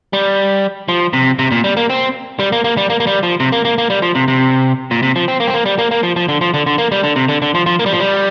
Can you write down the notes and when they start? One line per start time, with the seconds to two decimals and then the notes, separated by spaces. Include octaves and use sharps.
0.13 G3
0.89 F3
1.13 C3
1.39 C3
1.52 A#2
1.64 G3
1.77 A#3
1.90 C4
2.39 G3
2.52 A#3
2.64 A#3
2.77 G3
2.90 A#3
3.00 A#3
3.07 G3
3.23 F3
3.40 C3
3.52 A#3
3.65 A#3
3.78 A#3
3.90 G3
4.02 F3
4.15 C3
4.28 C3
4.91 A#2
5.03 C3
5.16 F3
5.28 C4
5.40 A#3
5.47 C4
5.54 A#3
5.65 G3
5.78 A#3
5.91 A#3
6.03 F3
6.16 F3
6.29 D3
6.41 F3
6.54 D3
6.66 D3
6.78 A#3
6.92 G3
7.03 D3
7.16 C3
7.29 D3
7.42 D3
7.55 F3
7.66 F3
7.79 A#3
7.86 G3
7.93 F3
8.00 G3